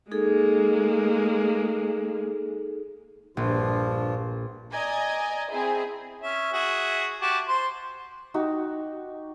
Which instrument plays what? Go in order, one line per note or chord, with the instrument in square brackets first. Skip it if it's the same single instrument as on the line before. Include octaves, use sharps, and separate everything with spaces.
[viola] G#3 A#3 [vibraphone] D#4 G#4 A4
[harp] A#1 [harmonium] G2 F3 F4
[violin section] D5 D#5 G#5 A#5 G#6
C4 E4 G#4 G#5
[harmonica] C#4 E5
F#4 G#4 E5
F#4 G4 A5
C5 C6
[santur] D#4 F#4 G4